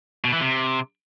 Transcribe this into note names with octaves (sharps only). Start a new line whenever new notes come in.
B2
E3
C3